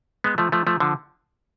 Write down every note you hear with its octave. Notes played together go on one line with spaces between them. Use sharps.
G#3 B3
F3 A3
F3 A3
F3 A3
D3 F3